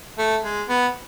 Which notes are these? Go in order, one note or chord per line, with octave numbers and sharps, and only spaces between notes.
A3
G#3
B3